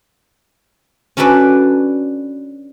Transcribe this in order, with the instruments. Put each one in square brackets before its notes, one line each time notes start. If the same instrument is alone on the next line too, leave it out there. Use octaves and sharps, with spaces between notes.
[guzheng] C#4 D4 F#4 A4 B4 D5